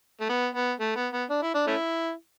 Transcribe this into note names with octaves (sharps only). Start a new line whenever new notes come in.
A3
B3
B3
A3
B3
B3
D4
E4
D4
A3 C#4 E4